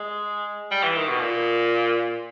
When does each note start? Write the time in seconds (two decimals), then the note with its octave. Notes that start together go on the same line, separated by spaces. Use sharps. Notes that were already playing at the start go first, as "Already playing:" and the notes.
Already playing: G#3
0.71 G3
0.83 E3
0.96 D#3
1.09 B2
1.21 A#2